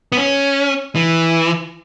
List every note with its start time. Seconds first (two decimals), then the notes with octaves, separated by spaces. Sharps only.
0.12 B3
0.17 C#4
0.95 E3